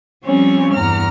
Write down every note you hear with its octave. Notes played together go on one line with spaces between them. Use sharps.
F3 G3 C4 C#4 C#5
E2 G2 A#5 F6